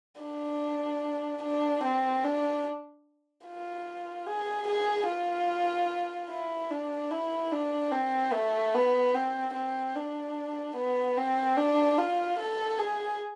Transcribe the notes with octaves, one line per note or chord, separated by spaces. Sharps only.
D4
D4
C4
D4
F4
G#4
G#4
F4
E4
D4
E4
D4
C4
A3
B3
C4
C4
D4
B3
C4
D4
F4
A4
G#4